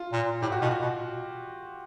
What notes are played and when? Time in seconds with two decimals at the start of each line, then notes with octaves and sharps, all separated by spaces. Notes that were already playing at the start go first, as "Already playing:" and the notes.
Already playing: F4
0.13 A#2
0.42 A2 G4
0.52 F#4
0.62 B2 F4
0.71 F#4
0.82 B2